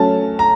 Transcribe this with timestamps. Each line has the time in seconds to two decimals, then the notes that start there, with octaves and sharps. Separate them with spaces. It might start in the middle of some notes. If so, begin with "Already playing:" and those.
Already playing: F#3 A3 C#4 A5
0.39 A#5